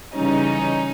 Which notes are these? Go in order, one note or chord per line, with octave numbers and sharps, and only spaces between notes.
C#3 E3 G3 C#4 D#4